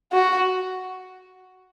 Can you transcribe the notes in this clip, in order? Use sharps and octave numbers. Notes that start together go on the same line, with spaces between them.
F#4